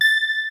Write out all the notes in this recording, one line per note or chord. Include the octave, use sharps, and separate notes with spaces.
A6